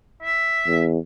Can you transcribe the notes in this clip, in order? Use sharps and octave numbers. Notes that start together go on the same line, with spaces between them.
E5
E2